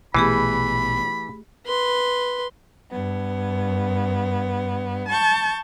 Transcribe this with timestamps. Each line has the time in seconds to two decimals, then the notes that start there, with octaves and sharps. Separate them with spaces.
0.14 A#1 B2 E3 A3 B3 G4 G#4 B5
1.67 B4 C6
2.90 G2 B3
5.09 A5 C#6 G6